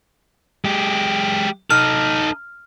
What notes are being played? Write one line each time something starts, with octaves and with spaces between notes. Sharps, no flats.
G#3 G4
D#4 A4 F6